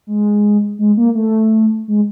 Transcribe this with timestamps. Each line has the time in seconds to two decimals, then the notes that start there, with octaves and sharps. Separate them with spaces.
0.07 G#3
0.79 G#3
0.97 A#3
1.15 A3
1.88 G#3